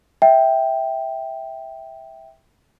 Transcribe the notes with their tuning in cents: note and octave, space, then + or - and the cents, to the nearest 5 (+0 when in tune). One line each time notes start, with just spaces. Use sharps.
E5 -10 G5 +0